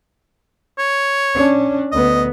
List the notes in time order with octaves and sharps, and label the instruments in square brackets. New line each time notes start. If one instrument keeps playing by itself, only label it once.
[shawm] C#5
[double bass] C#4 D4
[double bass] D2 B3 [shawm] D#5